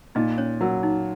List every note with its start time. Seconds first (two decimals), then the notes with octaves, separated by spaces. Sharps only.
0.15 A#2 D#4 D#5
0.38 C#4 C#5
0.61 F#3 A#4
0.83 D#4